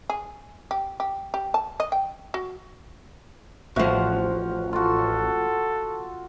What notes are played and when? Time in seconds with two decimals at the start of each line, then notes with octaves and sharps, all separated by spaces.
0.10 G#4
0.71 G4
1.00 G4
1.34 G4
1.54 A5
1.80 D#5
1.92 G5
2.34 F#4
3.76 A1 A2 F3 F#4 C5 F5 F#5
4.73 F4 F#4 A4